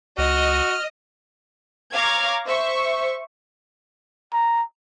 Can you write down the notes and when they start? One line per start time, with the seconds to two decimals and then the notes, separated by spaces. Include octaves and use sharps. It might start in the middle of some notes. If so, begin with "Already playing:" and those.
0.18 C#2 F#4 D#5 F6
1.92 C#5 F5 A#5 D6 F6 G#6
2.46 C5 E5 C#6
4.33 A#5